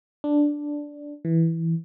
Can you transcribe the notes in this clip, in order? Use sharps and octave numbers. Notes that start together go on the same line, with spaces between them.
D4
E3